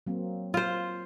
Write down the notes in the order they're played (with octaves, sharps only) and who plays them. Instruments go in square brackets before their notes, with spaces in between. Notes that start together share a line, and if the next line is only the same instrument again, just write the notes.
[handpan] F#3 A#3 C4
[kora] F4 C5